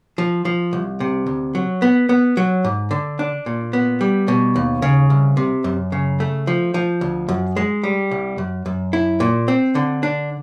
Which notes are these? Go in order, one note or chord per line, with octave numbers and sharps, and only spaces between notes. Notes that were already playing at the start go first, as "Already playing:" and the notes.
F3
F3
C2
C3
D2
F#3
B3
B3
F#3
G#2
D3
D4
A#2
B3
G3
B2
D#2
C#3
C2
C3
F#2
C#3
A3
F3
F3
D2
F#2
G#3
G3
C2
F#2
F#2
E4
A#2
C4
D3
D4